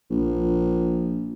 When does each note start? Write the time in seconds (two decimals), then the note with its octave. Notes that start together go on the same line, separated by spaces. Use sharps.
0.10 A#1